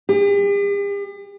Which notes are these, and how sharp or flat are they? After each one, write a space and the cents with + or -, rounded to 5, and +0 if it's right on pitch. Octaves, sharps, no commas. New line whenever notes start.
G4 +45